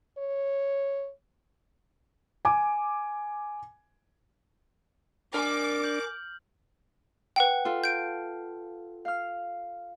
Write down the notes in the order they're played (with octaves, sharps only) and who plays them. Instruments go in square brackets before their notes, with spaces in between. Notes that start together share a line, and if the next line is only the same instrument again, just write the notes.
[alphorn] C#5
[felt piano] G#5 D6
[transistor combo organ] D4 [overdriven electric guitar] A#4 G#5 [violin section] D6 [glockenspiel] F6
[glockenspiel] G6 F#7
[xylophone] B4 F#5 G5
[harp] F4 A4
[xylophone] G6 D7
[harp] F5 F6